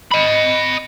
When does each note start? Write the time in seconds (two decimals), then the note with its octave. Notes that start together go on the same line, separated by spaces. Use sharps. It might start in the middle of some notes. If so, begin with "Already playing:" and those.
0.12 D#5 B5